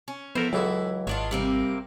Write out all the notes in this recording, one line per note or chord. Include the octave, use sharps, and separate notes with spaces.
C#4
F2 B3 E4 A4 A#4 C5
C#2 F#2 E3 F#3 F#4 G#4 A4
G#1 F#3 D4 F4 C#5 D#5
C3 G3 A#3 C4